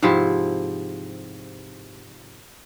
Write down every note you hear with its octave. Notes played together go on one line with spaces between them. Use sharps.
G#2 C3 F3 E4